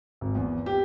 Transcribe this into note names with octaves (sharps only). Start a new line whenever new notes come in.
G#1
E2
G4